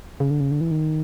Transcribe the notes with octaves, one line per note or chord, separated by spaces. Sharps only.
C#3
D3
C#3
D3
E3
D#3